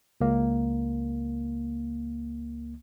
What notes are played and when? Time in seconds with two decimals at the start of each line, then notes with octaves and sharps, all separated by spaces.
0.21 C#2 A#3